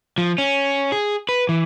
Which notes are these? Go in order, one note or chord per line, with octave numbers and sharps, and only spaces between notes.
F3
C#4
G#4
B4
E3